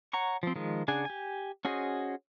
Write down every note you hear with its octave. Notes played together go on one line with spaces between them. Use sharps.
C#5 F#5 A#5 C#6
F3 C4
D#3 F3 G#3
C#3 D4 G#4 F#5 G#5
G4 G#5
C#4 F#4 G#4 C5 D#5